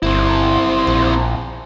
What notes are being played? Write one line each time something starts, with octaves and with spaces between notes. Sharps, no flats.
G1 C4 E4 C5
A#1